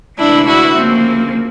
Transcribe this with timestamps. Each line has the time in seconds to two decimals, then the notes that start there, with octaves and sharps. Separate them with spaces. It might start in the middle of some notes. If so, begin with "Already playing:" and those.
0.18 D2 C3 E3 G#3 D4 E4
0.48 E4 F#4
0.77 D2 C#3 F3 A#3 C4